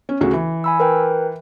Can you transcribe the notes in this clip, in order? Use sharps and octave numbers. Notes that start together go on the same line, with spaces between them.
C#4
D2 C#3 F#4
E3
G#5 B5 E6
A#4 B4 G5